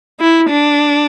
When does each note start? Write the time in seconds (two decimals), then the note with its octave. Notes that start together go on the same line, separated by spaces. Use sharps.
0.20 E4
0.49 D4